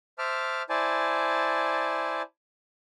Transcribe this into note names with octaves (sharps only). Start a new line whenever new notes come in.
C5 E5 A5 D6 F6
E4 C5 D5 G#5 A5